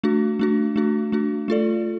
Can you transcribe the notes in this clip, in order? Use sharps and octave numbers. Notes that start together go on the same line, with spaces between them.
A3 D4 F#4
A3 D4 F#4
A3 D4 F#4
A3 D4 F#4
A3 F4 A4 D5